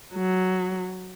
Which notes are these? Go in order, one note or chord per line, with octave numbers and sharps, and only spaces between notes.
F#3